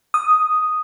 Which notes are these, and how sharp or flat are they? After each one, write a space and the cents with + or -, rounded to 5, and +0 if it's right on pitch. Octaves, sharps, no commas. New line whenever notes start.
D#6 +0